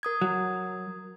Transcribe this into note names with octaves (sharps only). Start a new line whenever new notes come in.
A#4 D#6 G#6
F#3